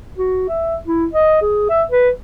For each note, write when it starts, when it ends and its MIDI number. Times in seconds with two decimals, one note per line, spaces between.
0.17 0.49 66
0.49 0.75 76
0.87 1.06 64
1.13 1.39 75
1.41 1.66 68
1.70 1.83 76
1.91 2.10 71